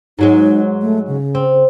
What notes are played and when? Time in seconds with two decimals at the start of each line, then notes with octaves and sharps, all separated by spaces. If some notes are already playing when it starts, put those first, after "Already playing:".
0.19 G#2 F#3 G#3 D#4
0.82 A3
1.07 C#3
1.35 C4